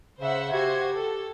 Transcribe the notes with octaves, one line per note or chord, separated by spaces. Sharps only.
C#3 C5 E5 F#5
F#4 G4 C5 G#6
A4